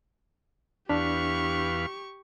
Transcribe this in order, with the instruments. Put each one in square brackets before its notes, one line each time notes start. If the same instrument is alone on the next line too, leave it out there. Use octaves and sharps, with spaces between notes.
[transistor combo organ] E2 B4 F5 [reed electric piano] D4 [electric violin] G4 C#6